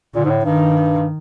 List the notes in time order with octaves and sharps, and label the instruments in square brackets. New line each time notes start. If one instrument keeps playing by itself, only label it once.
[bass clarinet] A#2 [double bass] D3
[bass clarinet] G#2
A2
[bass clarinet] G2 [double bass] D#3